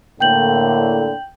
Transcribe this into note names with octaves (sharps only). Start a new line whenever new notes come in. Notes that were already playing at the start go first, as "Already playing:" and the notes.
A2 D3 A#3 G5 G6 F#7